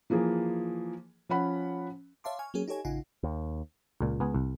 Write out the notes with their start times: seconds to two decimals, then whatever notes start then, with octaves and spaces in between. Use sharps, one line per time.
0.10 E3 F3 A#3 G#4
1.29 F3 C#4 F#5 B5
2.24 C#5 E5 F5 A5 C6 D6
2.39 G#5 C#6 F6
2.54 F#3 A#3 C#4 G#4
2.68 D#4 G4 A4 C#5 G#5
2.85 A1 C#3 D#4 F4 F#5 G#5
3.23 D#2
4.01 C#2 A#2
4.20 C#2 B3 G#4
4.35 C2